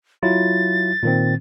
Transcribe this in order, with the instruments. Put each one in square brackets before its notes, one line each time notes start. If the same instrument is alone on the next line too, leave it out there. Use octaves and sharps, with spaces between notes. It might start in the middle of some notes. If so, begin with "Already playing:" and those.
[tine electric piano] F#3 E4 F4 [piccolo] A6
[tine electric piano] A#2 D#3 C4